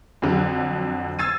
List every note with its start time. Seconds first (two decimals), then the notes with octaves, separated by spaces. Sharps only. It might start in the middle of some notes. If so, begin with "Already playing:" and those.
0.22 F2 D3 F#3
1.19 E6 G#6 A6 C7 D#7